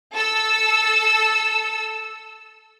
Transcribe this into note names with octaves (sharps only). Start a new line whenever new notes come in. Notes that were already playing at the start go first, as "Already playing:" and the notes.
A4 E6